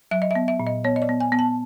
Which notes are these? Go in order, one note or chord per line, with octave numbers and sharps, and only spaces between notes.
F#3 E5
D#5
E5
B3
E5
A#2
D#5
B3 C#5
D#5
D5
B3
G#5
B3
A5